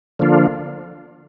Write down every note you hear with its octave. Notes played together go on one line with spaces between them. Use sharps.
D3 F3 A#3 D4 F4